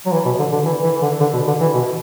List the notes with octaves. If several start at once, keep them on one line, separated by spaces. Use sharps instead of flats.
F#3
E3
B2
D3
D3
E3
E3
D3
D3
B2
D3
E3
B2